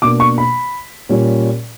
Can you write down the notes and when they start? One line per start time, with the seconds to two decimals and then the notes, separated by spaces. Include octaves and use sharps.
0.02 B2 A#3 D4 D6
0.20 C#6
0.38 B5
1.09 A#2 G3 C#4